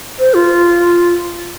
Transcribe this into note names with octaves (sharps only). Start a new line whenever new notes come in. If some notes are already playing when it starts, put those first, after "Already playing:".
C5
F4